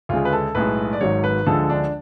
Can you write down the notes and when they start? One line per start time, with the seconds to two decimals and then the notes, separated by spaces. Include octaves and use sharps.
0.09 D2 C#3 G#3 F4
0.25 B4
0.32 A4
0.55 B1 A2 G#3 B4
0.93 D5
1.01 G#1 G#2 F#3 C#5
1.24 B4
1.46 D2 D3 F3 G#3 A4
1.70 D4